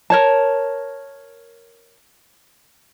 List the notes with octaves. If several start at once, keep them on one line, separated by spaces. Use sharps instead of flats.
A#4 C#5 A5